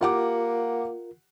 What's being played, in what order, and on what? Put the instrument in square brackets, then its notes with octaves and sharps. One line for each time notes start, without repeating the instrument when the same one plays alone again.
[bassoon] A#3 [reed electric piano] F4 A#4 [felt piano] G4 F#5 D6